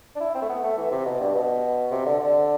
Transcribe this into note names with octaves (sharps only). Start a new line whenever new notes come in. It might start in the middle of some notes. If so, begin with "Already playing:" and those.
D4
E4
C4
A3
B3
A3
E3
C3
B2
G2
B2
C3
D3
D3